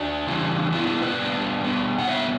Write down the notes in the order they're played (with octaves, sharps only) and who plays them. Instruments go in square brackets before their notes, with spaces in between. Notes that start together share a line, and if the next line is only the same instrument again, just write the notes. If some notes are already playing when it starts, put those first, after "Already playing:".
Already playing: [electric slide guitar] D4 F#4
C#3 E3 G3 C#4
B2 G3 B3 D4 E4
E4
B4 D5
B2 G3 B3 D4
B2 G3 B3 D4
F#5
B2 G3 B3 C#5 E5